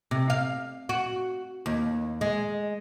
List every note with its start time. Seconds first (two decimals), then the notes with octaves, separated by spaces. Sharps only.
0.11 C3
0.30 F5
0.89 F#4
1.66 D#2
2.21 G#3